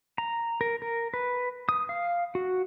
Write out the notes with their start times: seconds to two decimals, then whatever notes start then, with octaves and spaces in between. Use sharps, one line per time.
0.18 A#5
0.61 A#4
0.82 A#4
1.14 B4
1.69 D#6
1.89 F5
2.35 F#4